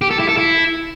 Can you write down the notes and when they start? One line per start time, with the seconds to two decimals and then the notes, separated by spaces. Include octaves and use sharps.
0.02 G4
0.11 A4
0.20 E4
0.29 A4
0.37 E4